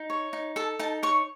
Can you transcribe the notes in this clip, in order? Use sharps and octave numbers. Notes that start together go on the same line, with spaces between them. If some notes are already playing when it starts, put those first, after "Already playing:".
Already playing: D#4
C#5
D#4
A4 A5
D#4 A5
C#5 C#6